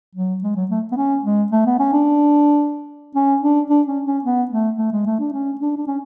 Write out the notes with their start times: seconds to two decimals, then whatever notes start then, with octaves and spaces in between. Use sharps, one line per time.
0.16 F#3
0.43 G#3
0.56 F#3
0.71 A3
0.92 B3
0.97 C#4
1.25 G#3
1.52 A3
1.66 B3
1.79 C#4
1.93 D4
3.15 C#4
3.42 D4
3.70 D4
3.87 C#4
4.06 C#4
4.25 B3
4.51 A3
4.78 A3
4.92 G#3
5.06 A3
5.20 D4
5.33 C#4
5.61 D4
5.77 D4
5.87 C#4